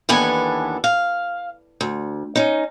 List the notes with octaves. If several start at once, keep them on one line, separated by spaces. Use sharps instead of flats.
D#2 E3 B3 D4 A4 G#5
F5
D2
C#4 D#4